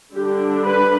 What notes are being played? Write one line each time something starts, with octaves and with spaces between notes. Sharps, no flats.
D3 G3 D4 G4
B4